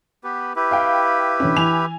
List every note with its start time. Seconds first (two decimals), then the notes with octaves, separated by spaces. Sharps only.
0.24 B3 G4 B4
0.56 E4 G4 B4
0.71 F5 G5
1.40 D3 E3 C#4
1.56 E3 G#5 F7